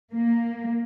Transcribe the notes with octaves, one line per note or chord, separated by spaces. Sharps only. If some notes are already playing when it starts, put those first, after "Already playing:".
A#3